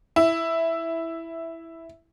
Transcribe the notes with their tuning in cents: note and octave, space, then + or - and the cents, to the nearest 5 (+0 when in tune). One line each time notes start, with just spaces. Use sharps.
E4 +0